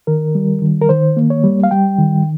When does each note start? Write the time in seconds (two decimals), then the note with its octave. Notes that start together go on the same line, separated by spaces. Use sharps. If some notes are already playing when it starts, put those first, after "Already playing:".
0.07 D#3 A#4
0.35 G3
0.62 D#3
0.82 A#4
0.89 D#3 C5
1.17 A#3
1.30 C#5
1.44 G3
1.64 F5
1.71 G3 G5
1.99 D#3